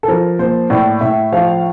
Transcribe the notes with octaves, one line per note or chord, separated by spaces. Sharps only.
A4
F3 A#4
A#3 C5
A2 D5
A2 E5
F3 F5